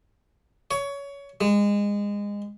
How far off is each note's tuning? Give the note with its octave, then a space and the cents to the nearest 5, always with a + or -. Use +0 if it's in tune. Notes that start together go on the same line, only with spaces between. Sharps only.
C#5 +20
G#3 -25